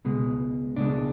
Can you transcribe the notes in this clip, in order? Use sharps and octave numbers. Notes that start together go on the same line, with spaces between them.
C#2 B2 G#3
C#2 B2 G#3 D4